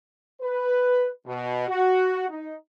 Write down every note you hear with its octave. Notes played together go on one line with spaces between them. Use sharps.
B4
B2
F#4
D#4